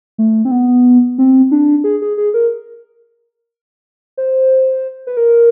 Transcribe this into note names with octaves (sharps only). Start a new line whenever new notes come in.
A3
C4
B3
C4
D4
G#4
G#4
G#4
A#4
C5
B4
A#4